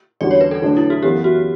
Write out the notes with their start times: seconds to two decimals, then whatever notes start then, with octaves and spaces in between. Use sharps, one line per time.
0.21 E2 D3 G3 C#4 F#4 D5
0.31 C#5
0.41 B4
0.51 A4
0.62 D3 F#3 A3 D4
0.77 E4
0.90 F#4
1.03 F#2 E3 B3 G4
1.24 F#4